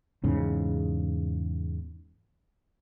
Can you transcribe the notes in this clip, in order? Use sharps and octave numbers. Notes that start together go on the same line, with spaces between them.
E2 G#2 C#3